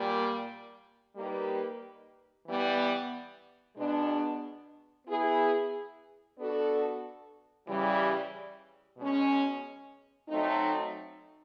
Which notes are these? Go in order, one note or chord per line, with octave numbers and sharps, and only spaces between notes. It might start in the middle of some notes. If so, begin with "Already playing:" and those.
Already playing: A#2 G3 A#3
G3 A#3 D#4 G4 B4
E3 G3 B3
B2 G#3 B3 D4
B3 E4 G#4
B3 D4 F#4 A4
C#3 E3 G3
B2 G#3 C#4
F#3 A3 C4 D#4